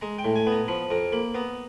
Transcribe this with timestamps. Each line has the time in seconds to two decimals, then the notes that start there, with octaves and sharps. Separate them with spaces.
0.01 G#3 A#5
0.18 G5
0.24 A2
0.36 G#5
0.47 B3
0.52 A#5
0.68 F3 B5
0.90 F2 A#5
1.12 A#3 B5
1.34 B3 A#5